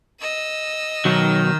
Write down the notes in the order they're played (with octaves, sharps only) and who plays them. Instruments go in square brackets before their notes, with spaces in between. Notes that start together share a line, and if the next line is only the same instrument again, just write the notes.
[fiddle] D#5 E6
[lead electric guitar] B1 F#3 [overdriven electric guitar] D#3